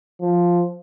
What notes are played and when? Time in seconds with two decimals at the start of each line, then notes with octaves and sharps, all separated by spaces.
0.21 F3